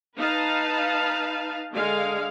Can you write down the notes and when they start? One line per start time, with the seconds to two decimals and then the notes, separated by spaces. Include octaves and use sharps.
0.16 D#4 B4 F5 A5
1.73 D3 G#3 F5